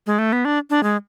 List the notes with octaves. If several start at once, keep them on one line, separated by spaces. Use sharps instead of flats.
G#3
A3
B3
D4
D4
G#3